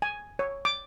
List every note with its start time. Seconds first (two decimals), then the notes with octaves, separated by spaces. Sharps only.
0.02 G#5
0.39 C#5
0.65 D6